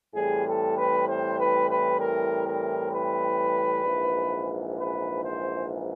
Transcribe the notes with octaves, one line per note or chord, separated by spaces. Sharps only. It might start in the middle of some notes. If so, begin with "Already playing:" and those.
A2 E3 G3 C4 G#4
A4
B4
C5
B4
B4
A#4
A#4
B4
A#1 G#2 E3
B4
C5